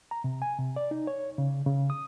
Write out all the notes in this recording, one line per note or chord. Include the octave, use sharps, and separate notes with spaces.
A#5
C3
G#5
C3
D5
D#4
C#5
C#3
C#3
D#6